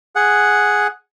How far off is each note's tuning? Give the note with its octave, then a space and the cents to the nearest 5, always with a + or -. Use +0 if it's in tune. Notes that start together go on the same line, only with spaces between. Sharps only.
G#4 +0 F#5 +0